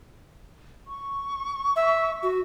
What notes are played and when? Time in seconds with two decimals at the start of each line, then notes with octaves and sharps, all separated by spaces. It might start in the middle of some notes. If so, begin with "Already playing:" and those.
0.87 C#6
1.76 E5
2.23 F#4